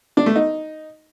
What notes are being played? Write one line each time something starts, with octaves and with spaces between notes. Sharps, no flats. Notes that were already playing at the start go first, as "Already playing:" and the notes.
D4
A3
D#4